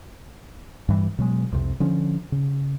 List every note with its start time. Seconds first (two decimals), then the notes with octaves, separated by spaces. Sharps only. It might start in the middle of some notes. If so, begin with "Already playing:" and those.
0.88 G2 E3 G3
1.18 B2 F#3 G#3
1.52 C2 F2 C3
1.80 D3 F3 C#4
2.32 C#3